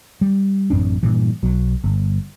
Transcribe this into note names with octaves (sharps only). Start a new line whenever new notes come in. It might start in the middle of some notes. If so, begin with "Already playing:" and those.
G3
A1 F#2 C4 D4
G2 A#2 E3
B1 F#3
G1